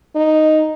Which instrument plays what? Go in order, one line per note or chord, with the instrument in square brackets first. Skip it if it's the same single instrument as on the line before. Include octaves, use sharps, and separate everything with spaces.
[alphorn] D#4